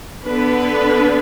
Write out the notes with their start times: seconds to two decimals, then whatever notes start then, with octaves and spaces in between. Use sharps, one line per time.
0.24 D3 B3 D4 B4